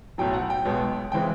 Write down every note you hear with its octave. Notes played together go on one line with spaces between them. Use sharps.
B1 A2 F#3 G5
F#5
G5
B1 B2 G#3 B3
C#3 E3 G#3 C4 G5